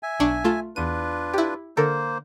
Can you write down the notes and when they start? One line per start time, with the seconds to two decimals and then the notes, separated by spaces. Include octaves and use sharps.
0.03 E5 G#5
0.20 B1 D4 C#6
0.44 A3 F4 A5
0.76 E2 D4 F4 B4 D#7
1.34 E4 G4
1.77 D3 A#3 A4 A#4 C5